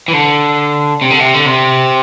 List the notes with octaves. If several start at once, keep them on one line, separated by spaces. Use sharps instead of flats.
E3
D3
C3
D3
C3
D3
C3